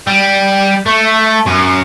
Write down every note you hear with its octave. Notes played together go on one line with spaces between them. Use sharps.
G3
A3
F#2